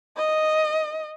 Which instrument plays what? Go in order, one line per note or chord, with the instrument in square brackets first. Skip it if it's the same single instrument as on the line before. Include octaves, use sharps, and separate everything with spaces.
[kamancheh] D#5